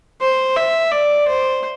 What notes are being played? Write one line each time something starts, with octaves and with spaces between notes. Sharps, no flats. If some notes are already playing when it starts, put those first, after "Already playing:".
C5
E5
D5
C5